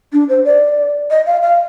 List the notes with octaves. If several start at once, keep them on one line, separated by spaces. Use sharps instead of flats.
D4
C5
D5
D#5
F5
F5